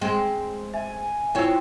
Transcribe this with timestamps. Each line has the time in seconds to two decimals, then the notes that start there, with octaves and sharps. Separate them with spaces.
0.01 G#3 C4
0.74 E5 G#5
1.35 C4 E4 F4 C#5 E6